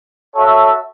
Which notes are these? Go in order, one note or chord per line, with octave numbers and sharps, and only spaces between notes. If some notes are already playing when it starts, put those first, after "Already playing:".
F#4 A4 C#5 E5